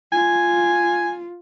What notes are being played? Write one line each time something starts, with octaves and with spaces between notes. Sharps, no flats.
F4 G#5